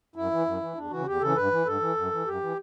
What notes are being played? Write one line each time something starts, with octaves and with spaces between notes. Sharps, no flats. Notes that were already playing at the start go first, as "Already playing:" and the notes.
F#2 E4
E3
F#2
E3
E2 D4
C#3 E3 F#4
E2 G4
C#3 E3 A4
G2 B4
E3
G2 A4
E3
F#2
E3
F#2 G4
E3